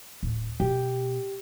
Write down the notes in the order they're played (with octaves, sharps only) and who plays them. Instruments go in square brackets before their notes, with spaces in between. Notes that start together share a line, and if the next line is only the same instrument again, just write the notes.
[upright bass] D1
[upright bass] B2 [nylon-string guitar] G4